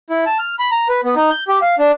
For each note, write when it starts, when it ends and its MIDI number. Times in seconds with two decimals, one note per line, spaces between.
0.10 0.25 64
0.26 0.38 81
0.39 0.55 89
0.59 0.70 83
0.72 0.88 82
0.89 1.01 71
1.04 1.15 59
1.16 1.30 63
1.30 1.44 91
1.48 1.59 67
1.62 1.75 77
1.79 1.91 62